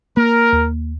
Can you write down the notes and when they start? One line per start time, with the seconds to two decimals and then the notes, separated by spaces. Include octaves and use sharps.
0.17 A#3 A#4
0.53 D#2